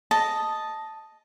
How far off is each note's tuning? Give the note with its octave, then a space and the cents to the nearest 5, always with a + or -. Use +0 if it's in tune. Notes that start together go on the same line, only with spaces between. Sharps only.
D#5 +0 A5 +0